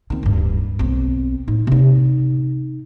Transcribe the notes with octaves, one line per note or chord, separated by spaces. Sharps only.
D#3 C4
D1 G2
B1 C4
A2 D#4
C3 D#4